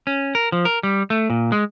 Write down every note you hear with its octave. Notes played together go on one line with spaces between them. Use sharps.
C#4
A#4
F3
A#4
G3
A3
A#2
G#3